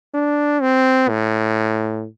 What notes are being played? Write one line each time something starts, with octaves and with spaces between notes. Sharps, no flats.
D4
C4
A2